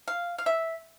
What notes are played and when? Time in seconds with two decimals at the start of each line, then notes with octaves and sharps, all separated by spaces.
0.08 F5
0.38 F5
0.46 E5